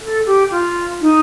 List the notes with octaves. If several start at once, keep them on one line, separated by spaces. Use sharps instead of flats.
A4
G4
F4
D#4